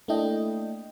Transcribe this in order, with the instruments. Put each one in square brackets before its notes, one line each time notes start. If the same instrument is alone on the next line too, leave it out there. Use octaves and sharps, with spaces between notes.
[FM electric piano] A3 A#3 D4 E4 D#5 G5